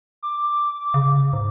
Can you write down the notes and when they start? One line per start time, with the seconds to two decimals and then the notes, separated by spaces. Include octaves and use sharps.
0.23 D6
0.94 C#3
1.33 G#2